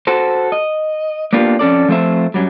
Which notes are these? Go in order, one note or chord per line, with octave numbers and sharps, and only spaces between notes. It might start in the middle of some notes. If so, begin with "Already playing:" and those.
F#4 A4 C5
D#5
A#3 B3 D4 F4 G4
F2 C#4 A4 D5
F3 A3 C4 A4 C5 E5
F#2 A#2 F#3 G3